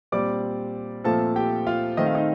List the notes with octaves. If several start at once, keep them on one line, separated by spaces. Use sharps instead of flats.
A#2 G3 C4 D5 D6
A#2 F3 A3 C4 A4 A5
G4 G5
F4 F5
D#3 A3 C4 D#5
F5
D#4 D#5